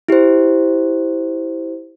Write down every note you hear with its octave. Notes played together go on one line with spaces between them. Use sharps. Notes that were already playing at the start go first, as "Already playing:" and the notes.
E4 G4 C5